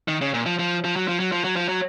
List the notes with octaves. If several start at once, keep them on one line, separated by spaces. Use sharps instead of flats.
D#3
C#3
A#2
F3
F3
F3
F#3
F3
F#3
F3
F#3
F3
F#3